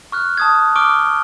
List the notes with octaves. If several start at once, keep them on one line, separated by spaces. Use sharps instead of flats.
C#6 F6 F#6
A5 D#6 G#6
C#6 D6 F6 D7 G7